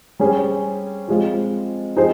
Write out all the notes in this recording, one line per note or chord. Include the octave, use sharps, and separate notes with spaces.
G3 C#4 G#4 C5
F3 G#3 C4 F4
F3 C4 D#4 G#4 C5